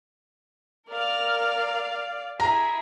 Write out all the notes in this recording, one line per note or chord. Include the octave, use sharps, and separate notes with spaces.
A#4 D5 F5 F6
E4 G#4 E5 A#5